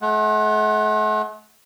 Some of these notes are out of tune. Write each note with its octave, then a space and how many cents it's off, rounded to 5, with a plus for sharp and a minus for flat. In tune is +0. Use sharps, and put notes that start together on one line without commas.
A3 -45 F#5 +0